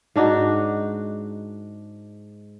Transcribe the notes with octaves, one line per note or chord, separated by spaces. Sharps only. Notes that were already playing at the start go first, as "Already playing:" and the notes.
G#2 D4 D#4 F#4